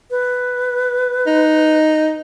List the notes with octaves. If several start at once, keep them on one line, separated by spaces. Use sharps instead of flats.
B4
D#4